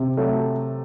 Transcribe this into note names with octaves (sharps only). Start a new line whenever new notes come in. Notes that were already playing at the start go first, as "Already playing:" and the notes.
Already playing: C3
F#3 A3